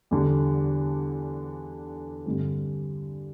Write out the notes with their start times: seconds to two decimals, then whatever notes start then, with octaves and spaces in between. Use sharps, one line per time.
0.11 E2 D3 G3 D4
2.26 G2 D3 G3 C4